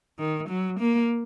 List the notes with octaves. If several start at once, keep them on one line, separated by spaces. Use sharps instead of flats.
D#3
F#3
A#3